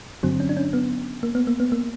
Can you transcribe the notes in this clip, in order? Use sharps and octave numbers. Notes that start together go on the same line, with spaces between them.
G2 D3 F#3 C4
C#4
D4
C#4
B3
A#3
B3
A#3
B3
A#3